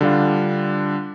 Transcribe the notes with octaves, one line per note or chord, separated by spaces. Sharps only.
D3 G3 D4 F4